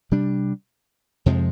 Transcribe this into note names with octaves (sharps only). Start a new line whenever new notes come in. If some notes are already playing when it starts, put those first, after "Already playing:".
C3 G3 D4
F2 C3 F3 G#3